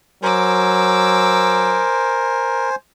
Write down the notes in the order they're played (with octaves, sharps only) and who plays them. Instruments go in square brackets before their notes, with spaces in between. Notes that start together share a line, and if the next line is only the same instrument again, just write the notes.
[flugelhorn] F#3 [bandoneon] A#4 [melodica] C5 G#5 [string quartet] D6 E6